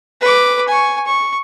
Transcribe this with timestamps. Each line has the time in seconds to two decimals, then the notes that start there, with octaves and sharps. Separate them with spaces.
0.21 B4 D6
0.68 G#5 C#6
1.06 C#6